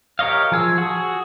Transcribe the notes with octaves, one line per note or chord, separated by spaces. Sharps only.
G4 A#4 C#5 D#5 F5
F3 G#4 E6
F#4 G#4